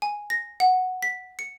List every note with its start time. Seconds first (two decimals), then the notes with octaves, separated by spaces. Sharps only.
0.02 G#5
0.30 A#6
0.60 F#5
1.03 B6
1.39 C#7